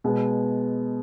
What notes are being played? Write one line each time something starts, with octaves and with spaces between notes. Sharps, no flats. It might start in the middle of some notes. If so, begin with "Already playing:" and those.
B2 G#3 B3